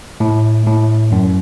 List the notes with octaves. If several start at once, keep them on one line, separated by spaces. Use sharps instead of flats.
A2
A2
F#2